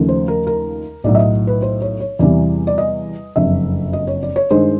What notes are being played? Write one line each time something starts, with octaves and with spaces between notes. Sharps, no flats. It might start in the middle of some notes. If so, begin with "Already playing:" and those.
Already playing: D#2 C#3 F3 A3
C5
A#4
A#4
B1 A2 F#3 D5
E5
D#5
B4
C5
C#5
C#5
E2 C3 E3 G3 D5
D5
D#5
F#1 F2 D3 E5
D#5
C#5
D5
C#5
G2 D#3 G#3 C5